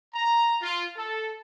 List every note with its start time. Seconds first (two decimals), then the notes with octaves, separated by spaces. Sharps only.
0.15 A#5
0.62 F4
0.97 A4